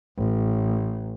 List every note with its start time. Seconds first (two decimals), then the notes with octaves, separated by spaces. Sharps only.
0.18 A1